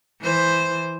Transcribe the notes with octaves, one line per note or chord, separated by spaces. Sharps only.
E3 C5